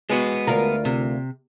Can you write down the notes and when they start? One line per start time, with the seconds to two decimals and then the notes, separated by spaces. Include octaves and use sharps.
0.09 G#3 B3 F#4
0.47 D2 F4 A#4
0.85 C3